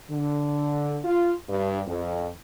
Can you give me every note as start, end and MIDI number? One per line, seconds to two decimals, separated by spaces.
0.10 0.98 50
1.04 1.34 65
1.49 1.81 43
1.87 2.28 41